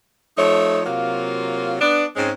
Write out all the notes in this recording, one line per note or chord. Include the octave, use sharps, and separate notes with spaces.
F3 A3 D#4 C#5
C3 F#3 A#3 F4
B3 D4
G#2 G#3 C4 C#4